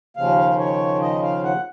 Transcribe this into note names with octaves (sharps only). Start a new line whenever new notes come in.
D#2 C#3 F3 F5
C#5
D#5
F5
F#5